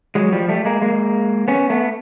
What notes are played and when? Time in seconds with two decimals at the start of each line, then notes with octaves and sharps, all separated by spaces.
0.15 F#3 G#3
0.33 F3 G3
0.49 G3 A3
0.65 G#3 A#3
0.81 G#3 A#3
1.48 B3 C#4
1.70 A3 B3